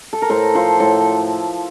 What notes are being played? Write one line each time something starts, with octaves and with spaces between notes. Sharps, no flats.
A4
A#4
A2 A4 C5
F3 A4 C5
A2 A4 C5